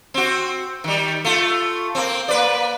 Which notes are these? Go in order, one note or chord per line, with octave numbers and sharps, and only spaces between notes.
C4 F#4
D#3 G3
A3 F4
A#3 C4
A#3 B4 D5